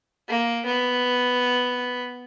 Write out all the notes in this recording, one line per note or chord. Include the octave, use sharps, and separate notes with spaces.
A#3
B3